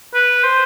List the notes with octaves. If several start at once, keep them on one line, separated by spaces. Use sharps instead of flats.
B4
C5